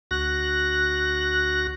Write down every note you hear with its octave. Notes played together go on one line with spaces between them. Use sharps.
D2 F#4 F#6 A#6